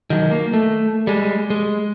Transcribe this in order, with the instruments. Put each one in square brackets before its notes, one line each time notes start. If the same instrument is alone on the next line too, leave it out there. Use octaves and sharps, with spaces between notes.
[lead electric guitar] D#3 F#3
A#3
A3
G3 G#3
G#3